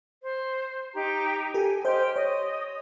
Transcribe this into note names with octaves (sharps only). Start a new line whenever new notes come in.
C5
D#4 G4 A#5
G4 A4 G#5
G4 C5 D#5 C6 F6 G6
C#5 D#5 D#6